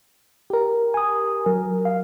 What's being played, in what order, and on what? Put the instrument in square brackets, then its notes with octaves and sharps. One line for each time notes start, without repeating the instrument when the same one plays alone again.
[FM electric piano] G4 A#4
[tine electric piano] G#5 D#6
[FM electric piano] F#3 [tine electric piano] A#4
[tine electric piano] F5